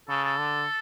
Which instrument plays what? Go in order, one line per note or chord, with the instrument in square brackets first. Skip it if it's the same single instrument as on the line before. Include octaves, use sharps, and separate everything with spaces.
[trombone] C#3 [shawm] A4
[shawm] A4
[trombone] D3